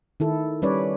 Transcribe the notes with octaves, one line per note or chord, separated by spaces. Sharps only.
D#3 E4 A4
G3 C#4 B4 C#5 D5